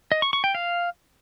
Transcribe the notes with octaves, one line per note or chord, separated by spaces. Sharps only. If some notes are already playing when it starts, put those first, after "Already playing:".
D#5
C#6
C#6
G5
F5